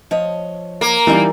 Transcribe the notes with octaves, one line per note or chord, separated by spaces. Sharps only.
F3 C#5 D#5
A#3
E3 G3 D#4 F4 D5